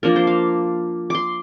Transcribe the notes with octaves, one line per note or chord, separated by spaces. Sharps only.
F3 A#3 D4 A#4
C5
F5
C6 D6